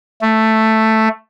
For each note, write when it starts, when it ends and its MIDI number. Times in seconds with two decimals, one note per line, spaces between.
0.22 1.09 57